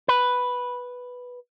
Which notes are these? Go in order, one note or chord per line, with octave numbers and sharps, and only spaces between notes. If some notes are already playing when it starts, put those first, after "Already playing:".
B4